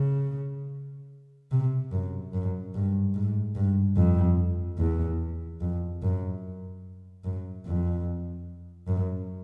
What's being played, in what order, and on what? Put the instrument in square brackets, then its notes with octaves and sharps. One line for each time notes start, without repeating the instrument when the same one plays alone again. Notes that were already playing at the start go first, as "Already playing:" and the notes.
Already playing: [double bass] C#3
C3
F#2
F#2
G2
G#2
G2
F2
E2
F2
F#2
F#2
F2
F#2